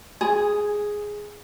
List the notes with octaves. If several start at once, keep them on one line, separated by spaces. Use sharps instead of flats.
G#4